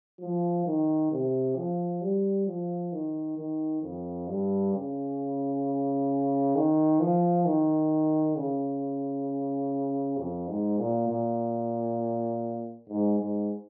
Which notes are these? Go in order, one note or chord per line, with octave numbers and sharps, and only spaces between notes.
F3
D#3
C3
F3
G3
F3
D#3
D#3
F2
G2
C#3
D#3
F3
D#3
C#3
F2
G#2
A#2
A#2
G#2
G#2